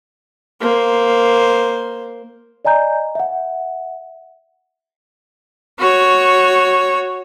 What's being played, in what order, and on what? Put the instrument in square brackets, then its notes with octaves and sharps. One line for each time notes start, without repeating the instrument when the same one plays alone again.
[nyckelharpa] A#3 C5
[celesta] D5 D#5 G#5 A#5 G6
E5 F#5
[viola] F#4 C#5